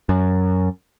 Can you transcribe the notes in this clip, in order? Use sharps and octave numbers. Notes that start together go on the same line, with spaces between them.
F#2